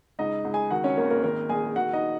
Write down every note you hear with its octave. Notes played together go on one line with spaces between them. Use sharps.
C#2 D#4 D#5
C#2
G#4 G#5
D#3 F#4 F#5
C#4 C#5
G#1 A#3 A#4
A#3 A#4
D#3 A#3 A#4
A#1 G#4 G#5
D#3 F#4 F#5
D#4 D#5